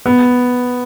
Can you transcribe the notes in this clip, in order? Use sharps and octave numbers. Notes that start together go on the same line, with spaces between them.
B3